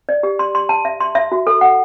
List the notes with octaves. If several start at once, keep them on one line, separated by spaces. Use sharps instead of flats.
D5
G4
C6
C6
A5
E5
C6
E5
F#4
A4
F#5